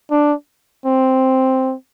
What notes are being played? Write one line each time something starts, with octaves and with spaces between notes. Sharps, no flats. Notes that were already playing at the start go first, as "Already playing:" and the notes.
D4
C4